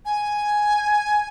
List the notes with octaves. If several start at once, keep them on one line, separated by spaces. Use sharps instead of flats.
G#5